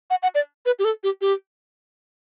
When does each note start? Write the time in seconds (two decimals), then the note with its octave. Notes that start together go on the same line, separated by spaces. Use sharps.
0.10 F#5
0.23 F#5
0.35 D5
0.66 B4
0.79 G4
0.85 A4
1.04 G4
1.21 G4